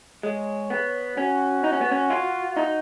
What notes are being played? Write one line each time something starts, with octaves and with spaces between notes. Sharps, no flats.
G#3 C#5
B3
C#4 F#4
D#4
C#4
B3
C#4
F4
D#4